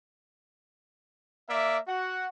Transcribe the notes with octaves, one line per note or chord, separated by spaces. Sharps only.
A#3 D5 E5
F#4 F#5